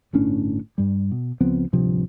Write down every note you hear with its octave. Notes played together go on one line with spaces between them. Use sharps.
G1 A2 C#4 D4
G2 G3
B2
C#2 F3 B3 C4
D1 G2 C3 F3